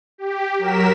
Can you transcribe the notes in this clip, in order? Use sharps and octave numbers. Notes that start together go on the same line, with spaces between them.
G4
F#3 A#4 B6 E7